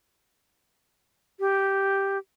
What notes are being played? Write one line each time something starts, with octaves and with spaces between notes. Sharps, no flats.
G4